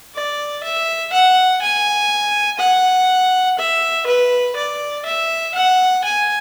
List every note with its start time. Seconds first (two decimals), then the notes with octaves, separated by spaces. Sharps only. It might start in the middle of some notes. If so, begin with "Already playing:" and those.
0.15 D5
0.63 E5
1.13 F#5
1.62 G#5
2.59 F#5
3.59 E5
4.07 B4
4.56 D5
5.06 E5
5.55 F#5
6.04 G#5